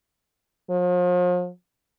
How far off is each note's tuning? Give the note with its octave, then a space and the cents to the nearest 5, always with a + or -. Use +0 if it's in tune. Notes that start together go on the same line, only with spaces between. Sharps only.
F3 +40